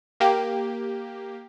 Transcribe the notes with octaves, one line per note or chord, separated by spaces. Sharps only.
A#3 G4